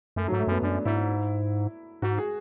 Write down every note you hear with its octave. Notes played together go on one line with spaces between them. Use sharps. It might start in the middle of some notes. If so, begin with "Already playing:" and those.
F#2 A3
F#3
G#2
A3
F#2 B3
F#2 D4
G#2 E4
G#2 F#4
G#4